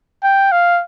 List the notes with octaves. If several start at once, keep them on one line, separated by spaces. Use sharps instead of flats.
G5
F5